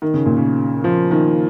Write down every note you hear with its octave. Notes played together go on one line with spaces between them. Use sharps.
D#3
C#3
A#2
C#3
F3
D#3